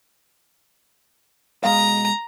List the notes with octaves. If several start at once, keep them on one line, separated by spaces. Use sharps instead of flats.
B2 G#3 F5 A#5